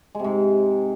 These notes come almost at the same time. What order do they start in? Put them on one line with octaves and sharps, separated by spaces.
G#3 C3 G#2